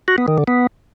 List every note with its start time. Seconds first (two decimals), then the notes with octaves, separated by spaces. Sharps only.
0.08 F#4
0.18 B3
0.28 D#3
0.38 D3
0.48 B3